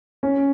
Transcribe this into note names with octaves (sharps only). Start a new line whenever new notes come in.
C#4